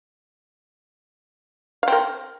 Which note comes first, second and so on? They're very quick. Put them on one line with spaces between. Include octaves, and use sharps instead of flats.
F5 C4 A#4